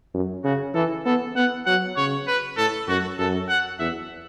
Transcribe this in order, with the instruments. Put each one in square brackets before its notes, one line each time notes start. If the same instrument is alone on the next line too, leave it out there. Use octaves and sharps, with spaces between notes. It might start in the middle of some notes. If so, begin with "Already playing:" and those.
[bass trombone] F#2
[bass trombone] C#3 [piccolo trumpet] F#4
[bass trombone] E3 [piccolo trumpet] A4
[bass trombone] B3 [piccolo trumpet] A4
[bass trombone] B3 [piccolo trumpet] F#5
[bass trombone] F#3 [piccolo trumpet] F#5
[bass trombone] C#3 [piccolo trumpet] C#5
[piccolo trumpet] B4
[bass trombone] A2 [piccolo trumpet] A4
[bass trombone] F#2 [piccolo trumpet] F#4
[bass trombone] F#2 [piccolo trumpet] A4
[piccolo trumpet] F#5
[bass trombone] E2 [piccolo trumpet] E5